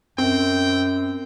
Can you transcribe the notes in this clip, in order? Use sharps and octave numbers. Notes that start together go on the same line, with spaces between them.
F#2 C4 G5